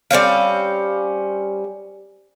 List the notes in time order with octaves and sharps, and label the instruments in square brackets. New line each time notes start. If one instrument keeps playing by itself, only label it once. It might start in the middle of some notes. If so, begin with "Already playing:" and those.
[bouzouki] G3 C4 C#4 F5